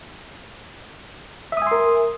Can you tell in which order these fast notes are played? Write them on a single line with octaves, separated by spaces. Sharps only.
E5 D#6 G#5 C6 A#4